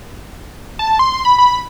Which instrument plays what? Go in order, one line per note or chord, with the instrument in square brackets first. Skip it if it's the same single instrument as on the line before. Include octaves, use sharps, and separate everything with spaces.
[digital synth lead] A5
C6
B5
B5